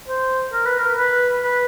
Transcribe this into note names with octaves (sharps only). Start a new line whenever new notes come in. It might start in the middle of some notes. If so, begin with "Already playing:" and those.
C5
A#4
B4
A#4
B4
B4